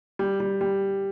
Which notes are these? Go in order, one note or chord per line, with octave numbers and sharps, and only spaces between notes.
G3
G3
G3